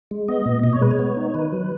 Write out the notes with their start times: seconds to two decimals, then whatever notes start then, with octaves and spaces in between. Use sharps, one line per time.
0.11 G#3
0.28 B3 D#5
0.46 A#2
0.63 B2 D#5
0.73 C#5
0.81 G#3 B4
0.91 C#5
0.99 B3
1.17 D#4
1.30 C#5
1.34 D#3 B4
1.52 F#3